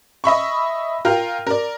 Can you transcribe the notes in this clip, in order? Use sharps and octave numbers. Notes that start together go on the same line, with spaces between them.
D#5 E5 B5 C#6
F4 A#4 G5 F6
A#4 D5